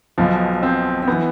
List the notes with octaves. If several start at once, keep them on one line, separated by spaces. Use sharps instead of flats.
B1 B2 F3
C4
C4
E3 B3